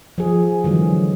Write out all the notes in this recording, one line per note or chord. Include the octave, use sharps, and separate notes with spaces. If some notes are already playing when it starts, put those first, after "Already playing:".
F3 G#4
D3 E3 F#3 G#3